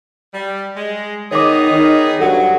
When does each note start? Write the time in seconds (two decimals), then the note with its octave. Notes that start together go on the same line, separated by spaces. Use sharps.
0.33 G3
0.76 G#3
1.31 D#3 B3 D#4 G#4 C#5 D6
1.70 D#3
2.20 G2 F#3 A4 F#5